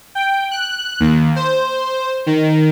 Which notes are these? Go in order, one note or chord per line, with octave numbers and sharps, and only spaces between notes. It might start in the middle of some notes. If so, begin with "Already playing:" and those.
G5
F#6
D#2
C5
D#3